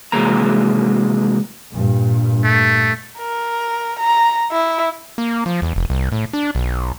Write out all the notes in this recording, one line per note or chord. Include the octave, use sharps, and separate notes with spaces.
C3 E3 F#3 G#3 A#3 A#5
G2 A#2
A3
A#4
A#5
E4
A#3
F3
E2
F1
C2
A2
D4
B1